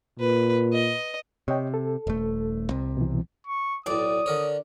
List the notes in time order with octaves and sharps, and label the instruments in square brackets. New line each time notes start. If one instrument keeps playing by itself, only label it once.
[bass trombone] A#2 [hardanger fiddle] B4
[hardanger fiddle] D#5
[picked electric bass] C3 [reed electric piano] C#5 D#5 G5
[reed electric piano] A4
[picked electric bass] D#1 A3
C2 C3
[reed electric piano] B2 E3
[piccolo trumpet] C#6
[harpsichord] B1 A2 [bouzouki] D5 [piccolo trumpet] D#6
[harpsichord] D3 A#4 C#5